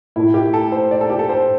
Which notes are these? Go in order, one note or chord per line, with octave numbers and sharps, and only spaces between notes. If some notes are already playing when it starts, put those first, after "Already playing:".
A2 A3 E4
G4
A4
C5
D5
A4
G4
A4
C5